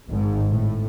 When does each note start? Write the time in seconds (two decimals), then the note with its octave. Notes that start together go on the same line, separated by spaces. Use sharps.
0.10 G#1 G#2
0.51 A2